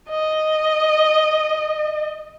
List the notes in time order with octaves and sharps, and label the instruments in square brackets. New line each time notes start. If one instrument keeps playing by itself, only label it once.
[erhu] D#5